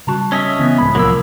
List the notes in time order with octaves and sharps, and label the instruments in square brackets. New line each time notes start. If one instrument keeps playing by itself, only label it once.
[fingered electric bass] C#3 G3 [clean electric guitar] F#4 A5
[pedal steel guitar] C#4 D#5 E5
[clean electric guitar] C#3 B3 [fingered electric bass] E3
[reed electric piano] C#2 A2 B5
[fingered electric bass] C2 [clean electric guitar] F3 A#4 [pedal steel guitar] F#3 A#3 E6